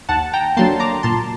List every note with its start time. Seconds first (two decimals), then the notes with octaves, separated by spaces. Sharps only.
0.09 D#2 F#5 A5
0.33 G5 A#5
0.57 D3 F#3 A#3 A5 C6
0.79 A#5 D6
1.03 A#2 A5 C6